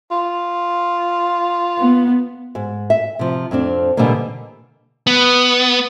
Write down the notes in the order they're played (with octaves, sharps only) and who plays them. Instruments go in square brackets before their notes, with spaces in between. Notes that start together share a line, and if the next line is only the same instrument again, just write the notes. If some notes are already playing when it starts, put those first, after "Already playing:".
[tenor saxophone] F4
[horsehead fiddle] B3
[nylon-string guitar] G#2
E5
C3 F3
F2 F3 C4 D4
B2 D3 E3 G3 A#3
[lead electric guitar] B3